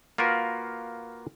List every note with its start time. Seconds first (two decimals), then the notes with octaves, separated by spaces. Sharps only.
0.18 A#3 F4 F#4 A#4 B4